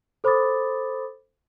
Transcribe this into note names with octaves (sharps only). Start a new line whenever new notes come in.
A4 C5 B5 D6 D#6 A6